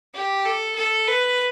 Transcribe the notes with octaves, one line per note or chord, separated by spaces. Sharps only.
G4
A4
A4
B4